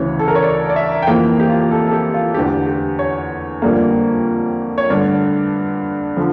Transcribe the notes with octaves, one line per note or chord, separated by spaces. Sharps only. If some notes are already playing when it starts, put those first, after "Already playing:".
Already playing: D2 C#3 E3 C#5
A4
A#4
C#5
D5
D5
E5
G5
F2 E3 A#3 F5
G4
F4
G4
A4
A4
G4
F4
E2 D3 A3 G4
G4
C#5
F2 D3 G3 A#3
C#5
G2 D3 A3 D5
D3 F3